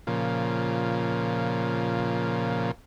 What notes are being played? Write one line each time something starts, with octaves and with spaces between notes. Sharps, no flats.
A#2 C#3 F3